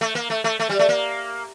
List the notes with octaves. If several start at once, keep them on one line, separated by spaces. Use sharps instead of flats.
A3
A#3
A3
A3
A3
G3
A3
A#3